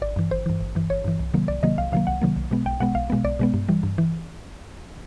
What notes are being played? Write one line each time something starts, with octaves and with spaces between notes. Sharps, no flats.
G#1 D5
G2 E3
G#1 C5
G2 E3
G#1
G2 E3
G#1 C#5
G2 E3
C2
C3 D#3 F#3 A#3
C2 D5
C3 D#3 F#3 A#3 D#5
C2 F5
C3 D#3 F#3 A#3 F5
C2 F#5
C3 D#3 F#3 A#3
B1
B2 G#3 B3
B1 G5
B2 G#3 B3 F#5
B1 F5
B2 G#3 B3
B1 D5
B2 G#3 B3
G2
E3 G3
G2
E3